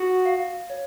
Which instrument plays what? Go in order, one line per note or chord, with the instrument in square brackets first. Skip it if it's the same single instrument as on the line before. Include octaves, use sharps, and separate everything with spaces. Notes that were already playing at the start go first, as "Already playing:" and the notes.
Already playing: [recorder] F#4 [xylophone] D#6
[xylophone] F5
C#5